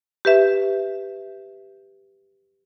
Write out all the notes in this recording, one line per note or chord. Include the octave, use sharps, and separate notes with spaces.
G4 B4 E5